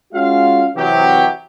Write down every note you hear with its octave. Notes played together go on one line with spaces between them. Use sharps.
G#3 C#4 F4 F#4 F5
C3 E3 F#3 G4